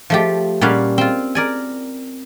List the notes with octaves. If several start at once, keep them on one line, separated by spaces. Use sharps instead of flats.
F3 A3 G4
A#2 G3 C#4 C#5 F5 F#5
C4 F4
A#4 D5 G#5